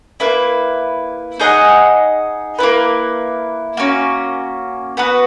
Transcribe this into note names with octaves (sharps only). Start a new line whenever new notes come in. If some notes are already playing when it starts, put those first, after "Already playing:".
A#3 E4 B4
D#4 G#4 D#5 F#5
A#3 E4 B4
A#3 C#4 F#4
B3 F#4 B4